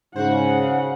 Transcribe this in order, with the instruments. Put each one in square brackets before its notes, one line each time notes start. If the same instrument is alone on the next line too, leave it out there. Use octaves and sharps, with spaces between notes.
[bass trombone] G#2 [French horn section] C#3 [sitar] F#4 C5 [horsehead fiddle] F#5